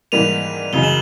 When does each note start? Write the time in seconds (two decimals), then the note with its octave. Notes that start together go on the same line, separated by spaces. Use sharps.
0.12 G#2 E3 G3 A#3 D#7 F7
0.73 F#2 C#3 E3 G#3 F7 G7
0.83 E7 F#7